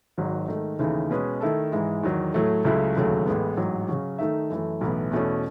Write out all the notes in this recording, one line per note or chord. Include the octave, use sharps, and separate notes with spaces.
G#1 G#2 D#3 F#3
G#2 D#3 A3
D#2 C#3 E3 A3 D#4
B2 G#3 C#4 G#4 B4
D#3 A3 E4 A4
G#2 E3 G#3
E2 D#3 F#3
A2 F#3 A3
C#2 C#3 F#3 A3 E4
E1 D#2 C#3 F#3 A3
A1 A2 G#3 B3
A1 G#2 F#3
C#3 F#3 C#4 F#4
D#3 A3 D#4 A4 E5
F#2 E3 A3
B1 A2 E3 B3
E2 B2 A3 C#4